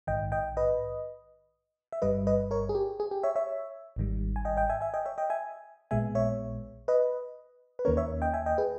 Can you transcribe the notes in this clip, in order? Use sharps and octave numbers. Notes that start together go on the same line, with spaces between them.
A#1 G#2 D#3 D#5 G5
D#5 G5
B4 D#5
E5
G1 G2 G3 B4 D#5
B4 D#5
A#4 C#5
G#4
G4
G#4
G4
C#5 E5
C#5 E5
G#1 G#2 D#3 G3
G#5
D#5 G5
D#5 G5
E5 G#5
E5 G#5
D#5 G5
C#5 E5
D#5 G5
E5 G#5
A#1 A#2 G#3 B3 E5 G#5
C#5 E5
B4 D#5
B4
D#2 D#3 A#3 C#4 A#4 C#5
C#5 E5
D#5 G5
E5 G#5
D#5 G5
G#4 B4